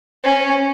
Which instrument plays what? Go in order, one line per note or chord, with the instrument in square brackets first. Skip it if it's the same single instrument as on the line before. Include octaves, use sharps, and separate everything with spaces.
[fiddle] C#4